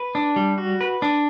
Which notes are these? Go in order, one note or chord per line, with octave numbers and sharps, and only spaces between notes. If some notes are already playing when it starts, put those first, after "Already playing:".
Already playing: B4
D4
G3
F#4
B4
D4